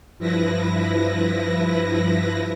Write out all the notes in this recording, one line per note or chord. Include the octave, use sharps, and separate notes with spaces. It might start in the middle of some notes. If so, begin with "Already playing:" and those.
G2 F3 E4 B4 A#6